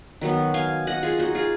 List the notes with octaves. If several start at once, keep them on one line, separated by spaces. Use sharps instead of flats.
D#3 F#3 B3
F5 G#5
D#5 F#5
F4 G#4
D#4 F#4
F4 G#4